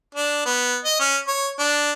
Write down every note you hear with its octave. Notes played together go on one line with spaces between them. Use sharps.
D4
B3
D#5
C#4
C#5
D4